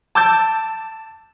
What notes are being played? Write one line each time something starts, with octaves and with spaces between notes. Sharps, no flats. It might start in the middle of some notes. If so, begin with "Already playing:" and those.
A5 D6 E6 G6 A6